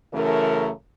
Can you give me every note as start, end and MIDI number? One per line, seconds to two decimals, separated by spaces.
0.13 0.70 42
0.13 0.70 49
0.13 0.70 52
0.13 0.70 57
0.13 0.70 70